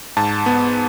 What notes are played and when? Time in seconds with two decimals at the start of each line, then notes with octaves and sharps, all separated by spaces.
0.17 G#2 A5
0.46 B3